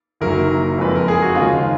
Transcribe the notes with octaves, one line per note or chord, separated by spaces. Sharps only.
F#1 F#2 D#3 F#3 A#3 A#4
F2 F3 G#3 B4
A#4
G#4
F#4
D#2 C#3 F3 G#3 F4